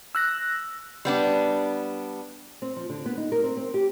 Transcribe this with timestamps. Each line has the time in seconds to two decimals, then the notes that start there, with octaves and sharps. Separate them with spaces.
0.15 E6 F#6 A#6
1.05 G3 B3 D4
2.62 C4
2.76 F3
2.89 D3
3.06 B3
3.17 D#4
3.32 A#4
3.44 C4
3.57 C4
3.74 G4